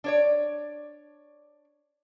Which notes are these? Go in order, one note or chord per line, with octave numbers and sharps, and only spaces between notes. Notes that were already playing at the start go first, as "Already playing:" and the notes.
D4 C#5 D5